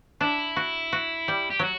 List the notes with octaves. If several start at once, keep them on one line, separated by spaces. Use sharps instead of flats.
D4 E4
F#4
F#4
G3
G4
F#3 F#4